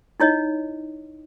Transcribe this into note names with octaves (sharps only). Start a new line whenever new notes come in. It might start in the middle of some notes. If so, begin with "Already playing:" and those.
D#4 E4 C#5 D#5